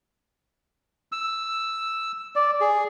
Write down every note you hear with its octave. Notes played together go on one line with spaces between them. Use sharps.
E6
D5
G#4